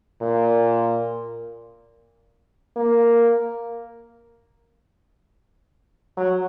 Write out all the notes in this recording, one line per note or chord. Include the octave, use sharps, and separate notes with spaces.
A#2
A#3
F#3